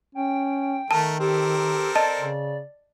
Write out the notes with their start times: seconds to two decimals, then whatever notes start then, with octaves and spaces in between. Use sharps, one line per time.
0.15 C#4 G5
0.91 D#3 A3 A#4 A5
1.20 C4 G4 A4 A#4
1.96 D5 D#5 A5
2.17 C#3